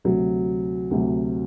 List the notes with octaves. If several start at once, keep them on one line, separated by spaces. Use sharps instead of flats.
D2 C3 F#3
D2 C3 F#3